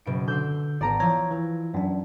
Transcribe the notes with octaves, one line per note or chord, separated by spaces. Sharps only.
F#1 B2 D7
D3 C6 E6 G6
G#1 B3 D5 A5 A#5
E3 F3 C#5 A#5 E6 G#6
E3
F#2 D4